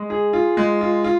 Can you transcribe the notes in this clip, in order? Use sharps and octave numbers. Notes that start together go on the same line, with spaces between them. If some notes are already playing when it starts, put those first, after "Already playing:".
Already playing: G#3
G#4
F4
G#3
F4
F4